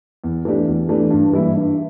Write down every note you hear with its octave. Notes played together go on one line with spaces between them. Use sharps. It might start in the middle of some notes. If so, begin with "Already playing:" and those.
E2
E3 A3 D4 G4
E2
E3 A3 D4 G4
G2
E3 G3 A#3 E4
G2